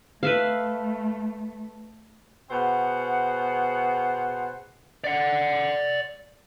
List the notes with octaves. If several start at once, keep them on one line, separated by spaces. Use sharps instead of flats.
A3 B4 E5 F5
B2 G#4 C5 F#5
D5 F#5